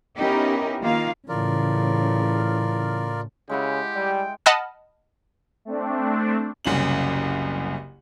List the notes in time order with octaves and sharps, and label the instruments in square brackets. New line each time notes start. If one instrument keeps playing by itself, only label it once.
[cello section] B3 C#4 D#4 E4 G4 A#4
D#3 A#3 F4 F5
[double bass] A2 [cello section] C#3 [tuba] E3 [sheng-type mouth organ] F4 A#4 D5
[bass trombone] C#3 [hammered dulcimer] G#3 E4 F#5 [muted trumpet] G4
[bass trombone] G3 [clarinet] G5
[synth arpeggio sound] D#5 F#5 A5 B5 D#6 F6
[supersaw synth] A3 C4 D4
[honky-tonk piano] F#1 C2 C#4 F#7